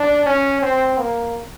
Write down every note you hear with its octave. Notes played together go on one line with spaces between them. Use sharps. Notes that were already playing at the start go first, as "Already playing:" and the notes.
Already playing: D4
C#4
C4
A#3